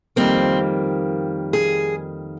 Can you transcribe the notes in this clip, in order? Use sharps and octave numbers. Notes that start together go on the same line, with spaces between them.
F2 D#3 G3 A#3 C4
G#4